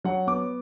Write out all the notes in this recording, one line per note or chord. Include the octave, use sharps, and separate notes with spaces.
F#3 F#5
B3 D6